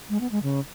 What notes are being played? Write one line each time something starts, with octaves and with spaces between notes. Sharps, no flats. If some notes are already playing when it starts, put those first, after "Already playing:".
G#3
B3
G#3
C#3